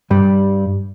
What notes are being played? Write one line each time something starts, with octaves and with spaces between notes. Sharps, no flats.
G2 G3